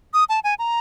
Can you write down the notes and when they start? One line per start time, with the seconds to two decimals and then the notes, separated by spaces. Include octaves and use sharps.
0.14 D#6
0.29 A5
0.44 G#5
0.59 A#5